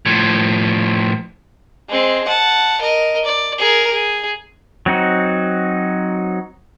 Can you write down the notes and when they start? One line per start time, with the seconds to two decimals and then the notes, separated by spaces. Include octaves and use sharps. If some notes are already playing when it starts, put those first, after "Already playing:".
0.06 A2 F3
1.89 G#3 C4
2.28 F#5 A5
2.81 A#4 D#5
3.25 D5
3.59 G#4 A#4
3.91 G#4
4.86 F#3 C4 D#4 F#4